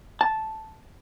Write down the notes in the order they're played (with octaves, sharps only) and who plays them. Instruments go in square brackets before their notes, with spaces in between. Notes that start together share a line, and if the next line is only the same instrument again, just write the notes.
[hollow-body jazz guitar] A5